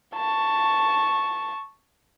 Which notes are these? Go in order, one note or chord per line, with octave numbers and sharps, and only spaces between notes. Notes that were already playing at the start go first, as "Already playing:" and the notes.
A5 C#6